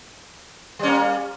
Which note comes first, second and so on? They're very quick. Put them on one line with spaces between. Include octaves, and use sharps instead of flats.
G3 C#4 A#3